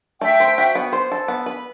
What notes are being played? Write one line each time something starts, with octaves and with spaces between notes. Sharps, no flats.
A3 E5 G5
C5
F#4
B3
C5
A4
B3
B4